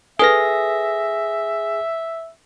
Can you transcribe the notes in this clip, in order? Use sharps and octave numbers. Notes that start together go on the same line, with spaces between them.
G#4 A4 B4 E5 A#6